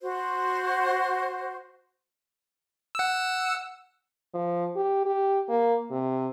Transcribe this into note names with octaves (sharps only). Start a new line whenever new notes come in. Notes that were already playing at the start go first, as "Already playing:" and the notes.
F#4 C5
F#5 E6
F3
G4
G4
A#3
C3